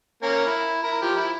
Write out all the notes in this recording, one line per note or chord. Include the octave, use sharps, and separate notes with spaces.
A#3 C#4 A#4
E4
E4 A#4
F3 G4
E4